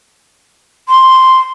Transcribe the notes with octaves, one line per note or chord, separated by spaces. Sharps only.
C6